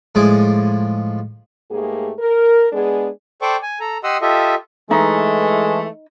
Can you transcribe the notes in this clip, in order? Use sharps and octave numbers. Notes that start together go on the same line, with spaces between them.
A2 F3 G#3 G#4 D6
G#2 A3 A#3 G4 G#4
A#4
G#3 B3 D4 G#4
A4 C5 D5 G5 C#6 D6
G#5
A4 A#5
G4 D#5 F#5 C6 D#6 E6
F4 G4 A4 D#5 E5
E3 G#3 A3 D#4